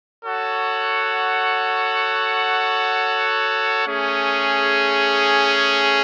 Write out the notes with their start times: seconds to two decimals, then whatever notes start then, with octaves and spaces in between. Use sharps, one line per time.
0.23 F#4 A4 C#5 F#5
3.85 A3 C#4 G#4